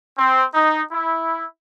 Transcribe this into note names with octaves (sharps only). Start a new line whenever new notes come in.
C4
D#4
E4